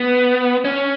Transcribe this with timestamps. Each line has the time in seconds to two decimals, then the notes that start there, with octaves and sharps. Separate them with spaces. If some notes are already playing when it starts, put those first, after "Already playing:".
Already playing: B3
0.65 C#4